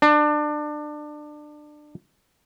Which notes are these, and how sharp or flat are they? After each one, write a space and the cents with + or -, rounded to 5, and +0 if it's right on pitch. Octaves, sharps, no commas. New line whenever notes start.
D4 +25